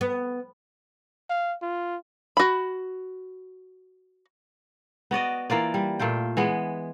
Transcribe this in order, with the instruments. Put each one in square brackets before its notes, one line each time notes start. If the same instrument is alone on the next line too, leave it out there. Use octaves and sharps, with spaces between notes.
[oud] B3
[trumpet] F5
F4
[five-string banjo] F#4 B5
[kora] B3 F#4 D5 D#5
E3 A#3 F4 D5
G3
A#2 A3 F4 G5
E3 G#3 B3